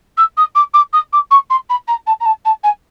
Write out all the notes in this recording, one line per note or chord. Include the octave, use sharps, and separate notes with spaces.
E6
D#6
D6
D6
D#6
D6
C#6
C6
B5
A#5
A5
A#5
A5
A5
G#5